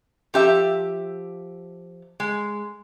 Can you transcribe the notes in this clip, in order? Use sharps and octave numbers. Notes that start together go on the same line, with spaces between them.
F3 G4 E5
G#3